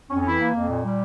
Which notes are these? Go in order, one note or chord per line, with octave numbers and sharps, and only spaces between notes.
F2 C#4
C#4
E3 E4
A#3
F2
A#2
G3